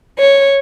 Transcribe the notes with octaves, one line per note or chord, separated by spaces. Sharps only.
C#5